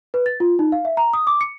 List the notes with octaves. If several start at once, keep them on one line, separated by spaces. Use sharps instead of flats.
B4
A6
F4
D#4
F5
E5
A#5
D#6
D6
C#7